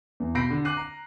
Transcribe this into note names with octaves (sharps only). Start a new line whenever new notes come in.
E2
B2 B5 G6 A#6 C7 D7
D3
D6 F#6 C7 D#7
A#5